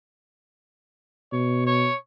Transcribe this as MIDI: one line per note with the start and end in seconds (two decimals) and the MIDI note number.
1.32 1.87 47
1.32 1.66 73
1.66 1.96 73